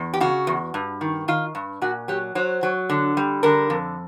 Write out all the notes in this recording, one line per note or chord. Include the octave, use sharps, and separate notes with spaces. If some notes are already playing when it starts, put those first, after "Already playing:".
Already playing: E2
G4
C#3 F#4
E2
G2
D#3
D#3 F4
G2
A#2 F#4
F#3 G4
F#3 C5
F#3
D3
G3
D3 A#4
F2